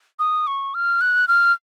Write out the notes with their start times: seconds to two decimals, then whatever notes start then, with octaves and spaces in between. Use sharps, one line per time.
0.19 D#6
0.47 C#6
0.74 F6
1.01 F#6
1.28 F6